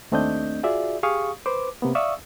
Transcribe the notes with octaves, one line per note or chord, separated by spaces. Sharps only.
D#2 A3 C4 D4 D#5 G6
F4 F#4 G#4 D5 E5
G4 G#4 F5 C#6 D#6
B4 C5 D6
C3 A#3 B3
D5 E5 F5 C#6 D#6 E6